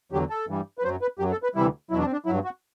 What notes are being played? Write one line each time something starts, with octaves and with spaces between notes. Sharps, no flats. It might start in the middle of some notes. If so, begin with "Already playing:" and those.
E2 D3 F#3 G4
A4
G2 E3 G3
B4
F#2 F#3 C5
B4
F#2 F#3 G4
A4
B4
D2 C3 E3 G3 E4
E2 B2 F#3 E4
D4
C4
D4
G2 F#3 E4
F#4